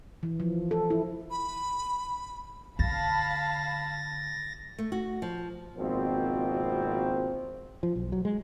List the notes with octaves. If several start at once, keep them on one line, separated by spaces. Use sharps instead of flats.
E3
F3
A4
E4
B5
D3 F5 A5 B5 A6 A#6
A3
F#4
F3
G#1 B2 F3 A#3 C4
F3
B1
F#3
G#3